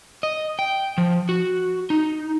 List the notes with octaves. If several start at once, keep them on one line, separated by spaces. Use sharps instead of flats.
D#5
G5
F3
F#4
D#4